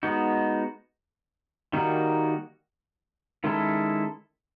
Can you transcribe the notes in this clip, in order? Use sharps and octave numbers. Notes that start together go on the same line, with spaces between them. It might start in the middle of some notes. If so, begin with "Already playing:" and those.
G#3 B3 D#4 F#4
D#3 G3 A#3 D#4 F#4
D#3 G#3 C#4 E4 A4